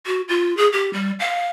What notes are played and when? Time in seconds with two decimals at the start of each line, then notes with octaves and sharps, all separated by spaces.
0.07 F#4
0.29 F4
0.57 G#4
0.73 G4
0.93 G3
1.20 F5